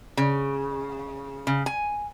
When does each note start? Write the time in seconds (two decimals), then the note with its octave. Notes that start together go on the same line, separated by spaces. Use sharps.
0.17 C#3
1.47 C#3
1.66 G#5